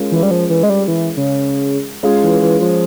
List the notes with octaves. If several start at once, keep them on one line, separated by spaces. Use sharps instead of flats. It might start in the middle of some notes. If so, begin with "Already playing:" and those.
Already playing: G#3 C#4 F4 A#4
E3
G3
F3
E3
G#3
G3
E3
C#3
G#3 C#4 F4 G#4
E3
E3
F3